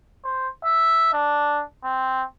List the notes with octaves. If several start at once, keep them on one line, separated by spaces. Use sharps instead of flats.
C5
E5
D4
C4